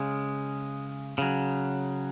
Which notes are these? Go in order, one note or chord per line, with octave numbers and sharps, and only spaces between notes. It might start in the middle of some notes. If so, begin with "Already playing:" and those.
Already playing: C#3 G#3
C#3 F#3